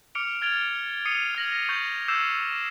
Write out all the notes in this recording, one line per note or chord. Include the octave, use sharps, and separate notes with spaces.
D6 F6 C#7 D7 F7
F6 G#6 A6 D7 F7 G7
D#6 C7 C#7 D#7
F6 G#6 A#6 F#7
C#6 G6 A6
D6 E6 G6 C7 E7